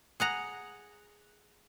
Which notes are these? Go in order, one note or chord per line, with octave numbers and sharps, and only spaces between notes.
G#4 F#5 A#5